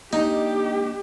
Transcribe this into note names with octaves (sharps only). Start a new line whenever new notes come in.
A#3 D4 D#4 G4 D#5